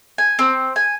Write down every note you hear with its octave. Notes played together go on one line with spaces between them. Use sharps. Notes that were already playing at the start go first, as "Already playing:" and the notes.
G#5
C4
G#5